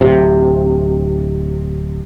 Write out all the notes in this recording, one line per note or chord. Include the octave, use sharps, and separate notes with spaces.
D1 C3